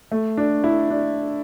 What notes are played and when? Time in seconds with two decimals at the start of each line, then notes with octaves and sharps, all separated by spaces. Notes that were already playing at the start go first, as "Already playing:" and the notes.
0.12 A3
0.37 D4
0.64 E4
0.90 D4